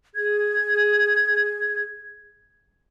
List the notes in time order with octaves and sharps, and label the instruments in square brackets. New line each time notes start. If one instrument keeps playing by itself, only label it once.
[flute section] G#4 G#6